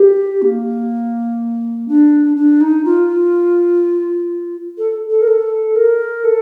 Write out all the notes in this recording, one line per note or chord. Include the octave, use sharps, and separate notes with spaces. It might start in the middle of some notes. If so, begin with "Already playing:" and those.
Already playing: G4
A#3
D4
D4
D#4
F4
A4
A4
A#4
A4
A#4
A4